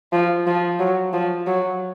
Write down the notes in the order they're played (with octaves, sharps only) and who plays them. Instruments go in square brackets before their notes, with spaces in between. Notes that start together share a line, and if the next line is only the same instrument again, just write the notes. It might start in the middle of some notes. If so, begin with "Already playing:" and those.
[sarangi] F3
F3
F#3
F3
F#3